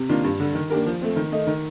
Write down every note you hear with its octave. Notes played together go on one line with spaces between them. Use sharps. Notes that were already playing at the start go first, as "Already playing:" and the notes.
Already playing: C3
D#3 A#3 D4 F4
G2
D3 G3
D#3
A#3 D4 G4 A#4
F3
A3 C4
D#3
A3 D#4
D#3